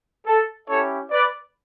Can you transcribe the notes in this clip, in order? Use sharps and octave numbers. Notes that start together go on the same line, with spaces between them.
A4
C#4 E4 G4 A4 C#5
B4 D5